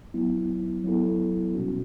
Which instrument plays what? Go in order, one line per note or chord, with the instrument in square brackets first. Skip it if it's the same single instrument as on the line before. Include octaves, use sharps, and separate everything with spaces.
[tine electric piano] F#3 B3 E4
F#3 B3 E4 A4
B2 G3 C#4 F#4